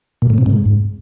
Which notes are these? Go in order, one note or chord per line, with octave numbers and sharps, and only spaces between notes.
A#2
A2
C3
G#2